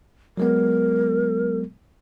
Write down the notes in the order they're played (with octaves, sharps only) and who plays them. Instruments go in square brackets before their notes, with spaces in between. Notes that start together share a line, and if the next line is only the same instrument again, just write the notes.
[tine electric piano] F#3 G#3 B3 [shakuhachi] A#4